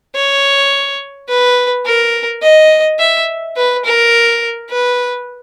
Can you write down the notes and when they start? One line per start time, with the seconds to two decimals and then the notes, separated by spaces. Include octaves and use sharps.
0.15 C#5
1.29 B4
1.86 A#4
2.42 D#5
2.99 E5
3.57 B4
3.85 A#4
4.70 B4